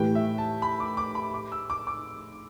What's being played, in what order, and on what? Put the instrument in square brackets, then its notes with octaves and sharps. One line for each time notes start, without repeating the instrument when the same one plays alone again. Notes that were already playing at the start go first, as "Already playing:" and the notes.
Already playing: [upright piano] A2 E3 A3 G4 B4 [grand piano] G5
[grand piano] E5
A5
B5
D6
D6
B5
D6
E6
D6
D6